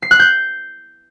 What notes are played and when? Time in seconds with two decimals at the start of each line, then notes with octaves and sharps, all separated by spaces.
0.02 C7
0.11 F#6
0.19 G6